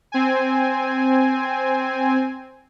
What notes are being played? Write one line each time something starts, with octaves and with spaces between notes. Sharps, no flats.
C4 G#5